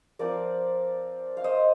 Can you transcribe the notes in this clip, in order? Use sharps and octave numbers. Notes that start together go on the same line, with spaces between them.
F3 C4 F4 A#4 D5
F5
C5 D#5